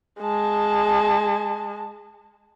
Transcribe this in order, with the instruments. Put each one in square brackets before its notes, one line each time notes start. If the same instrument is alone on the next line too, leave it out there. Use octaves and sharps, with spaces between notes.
[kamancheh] G#3 A5